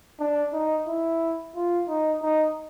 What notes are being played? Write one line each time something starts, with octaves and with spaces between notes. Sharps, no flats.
D4
D#4
E4
F4
D#4
D#4